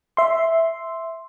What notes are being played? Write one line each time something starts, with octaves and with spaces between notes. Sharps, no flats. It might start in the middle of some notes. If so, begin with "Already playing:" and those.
E5 C6